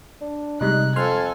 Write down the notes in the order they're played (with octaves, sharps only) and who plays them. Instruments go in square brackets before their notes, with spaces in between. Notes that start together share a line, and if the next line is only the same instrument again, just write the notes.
[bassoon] D4
[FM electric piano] C3 G3 G#3 [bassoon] D#4 [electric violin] F#6
[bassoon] F2 [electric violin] A4 G#5 [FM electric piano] C6 F6